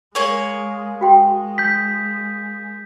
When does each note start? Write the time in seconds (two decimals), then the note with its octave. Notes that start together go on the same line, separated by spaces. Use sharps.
0.15 G#3 A#3 G#4 C#5
1.01 G#3 F#4 G5 C6
1.58 G6 B6